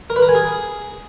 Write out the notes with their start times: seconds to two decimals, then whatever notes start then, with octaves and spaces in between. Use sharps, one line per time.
0.10 A#4
0.16 B4
0.22 A#4
0.29 G#5
0.35 G#4